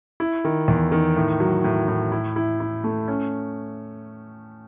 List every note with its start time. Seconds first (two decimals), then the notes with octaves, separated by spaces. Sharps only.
0.20 E4
0.45 D#3
0.68 E2
0.92 D#3
1.16 A2
1.40 F#3
1.64 A2
1.88 A2
2.12 E4
2.36 E4
2.60 E4
2.84 A3
3.08 C#4